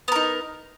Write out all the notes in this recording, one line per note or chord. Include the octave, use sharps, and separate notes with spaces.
B3 D#4 A#4